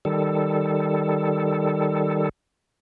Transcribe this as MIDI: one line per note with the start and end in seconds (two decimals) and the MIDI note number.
0.05 2.29 51
0.05 2.29 55
0.05 2.29 69